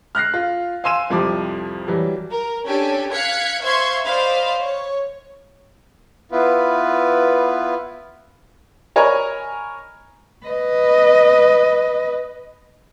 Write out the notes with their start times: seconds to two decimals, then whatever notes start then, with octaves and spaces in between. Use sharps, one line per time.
0.15 F6 F#6 A#6 C7
0.34 F4
0.84 F5 G#5 C6 E6 D#7 E7
1.10 C2 F2 F3 G3 D6
1.88 E3 F#3 G3
2.30 A#4
2.65 C#4 D4 G4 A4 G#5
3.12 F5 F#6 G#6 B6 C#7
3.62 C5 E5 F5 C6 C#6 G#6
4.04 C5 D5 D#5 F5 B5
4.59 C#5
6.32 B3 E4 F4 B4
8.96 A#4 C#5 D#5 G#5 A#5 B5
10.46 B4 D#5